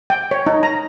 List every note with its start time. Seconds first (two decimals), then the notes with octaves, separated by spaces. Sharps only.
0.10 G5
0.31 C#5
0.47 D#4
0.63 A#5